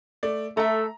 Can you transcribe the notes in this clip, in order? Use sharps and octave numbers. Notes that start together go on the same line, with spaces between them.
A3 D5
A3 A4 E5 A#5